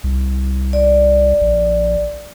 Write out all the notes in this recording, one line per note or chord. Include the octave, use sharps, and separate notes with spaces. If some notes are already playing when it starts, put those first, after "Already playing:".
C2
D5
A#1